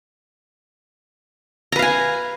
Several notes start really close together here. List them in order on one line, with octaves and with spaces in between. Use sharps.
A#5 B4 F5 G#5